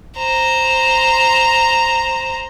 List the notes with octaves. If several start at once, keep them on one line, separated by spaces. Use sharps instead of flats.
C5 A#5